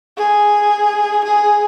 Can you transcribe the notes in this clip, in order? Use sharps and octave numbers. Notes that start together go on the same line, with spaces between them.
G#4
G#4